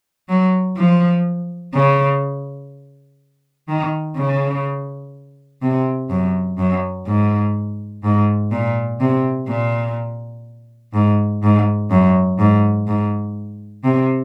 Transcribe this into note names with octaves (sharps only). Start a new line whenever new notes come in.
F#3
F3
C#3
D#3
C#3
C3
F#2
F#2
G#2
G#2
A#2
C3
A#2
G#2
G#2
F#2
G#2
G#2
C3